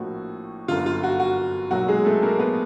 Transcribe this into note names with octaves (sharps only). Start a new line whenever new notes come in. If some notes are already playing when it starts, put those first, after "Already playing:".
Already playing: A#1 A2 F3 A#3 F#4
G1 F#2 D3 F4
F4
F#4
F#4
B1 A#2 F#3 A#3 F#4
G#3 G#4
A3 A4
A#3 A#4
B3 B4